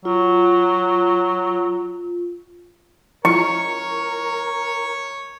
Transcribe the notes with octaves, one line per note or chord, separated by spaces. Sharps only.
F#3 F4
F3 E4 F4 A#4 C#5 C#6